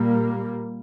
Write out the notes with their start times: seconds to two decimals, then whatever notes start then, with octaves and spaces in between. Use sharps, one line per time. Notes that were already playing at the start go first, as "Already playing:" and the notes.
Already playing: A#2 G3 A#3